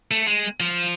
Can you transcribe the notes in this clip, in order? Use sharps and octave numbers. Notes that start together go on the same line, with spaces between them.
A3
G#3
F3